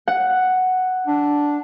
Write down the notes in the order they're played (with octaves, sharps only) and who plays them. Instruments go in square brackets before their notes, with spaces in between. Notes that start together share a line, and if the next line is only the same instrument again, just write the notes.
[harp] F#5
[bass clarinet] D4